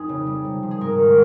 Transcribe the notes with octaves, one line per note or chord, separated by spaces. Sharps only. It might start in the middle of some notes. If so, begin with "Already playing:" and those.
Already playing: F2 D#4 G#4
C#3
G3
C3
F3
G#4
G#2 A#4
D#3